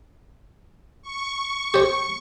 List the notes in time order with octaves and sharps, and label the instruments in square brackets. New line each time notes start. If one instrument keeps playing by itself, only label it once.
[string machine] C#6
[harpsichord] G4 C#5